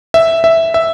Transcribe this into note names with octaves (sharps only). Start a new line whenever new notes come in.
E5
E5
E5